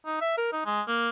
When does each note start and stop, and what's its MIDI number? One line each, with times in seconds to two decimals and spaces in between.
0.06 0.17 63
0.21 0.37 76
0.38 0.52 70
0.53 0.64 63
0.65 0.82 56
0.88 1.10 58